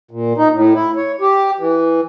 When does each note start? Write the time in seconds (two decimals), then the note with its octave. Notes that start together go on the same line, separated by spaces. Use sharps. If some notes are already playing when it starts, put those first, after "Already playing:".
0.11 A#2
0.37 D#4
0.53 A2
0.74 E4
0.96 C#5
1.21 G4
1.59 E3